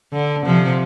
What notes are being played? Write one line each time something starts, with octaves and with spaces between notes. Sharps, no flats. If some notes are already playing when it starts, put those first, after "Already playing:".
D3
C3 F3